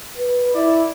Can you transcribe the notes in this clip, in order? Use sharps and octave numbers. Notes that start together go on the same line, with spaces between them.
B4
E4 D5